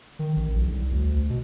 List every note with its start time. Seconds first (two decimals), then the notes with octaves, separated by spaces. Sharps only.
0.19 D#3
0.36 A1
0.55 B1
0.71 C2
0.92 D2
1.30 B2